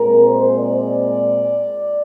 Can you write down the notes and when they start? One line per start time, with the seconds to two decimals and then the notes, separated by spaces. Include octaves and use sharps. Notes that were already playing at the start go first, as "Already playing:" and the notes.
Already playing: A#2 G#3 C4 A#4
0.25 C5
0.57 D5